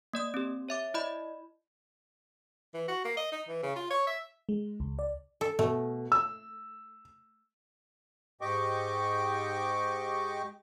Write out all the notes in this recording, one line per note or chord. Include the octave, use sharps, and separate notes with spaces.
A#3 D5 D#6
C4 G4
C#5 E5 D6
E4 D5 D#5 B5
E3
F#4
A#3
D#5
D#4
E3
C#3
F4
C#5
E5
G#3
C#2
D5
A4
B2 A3
E6
G#2 G4 D#5 G5 C#6 D6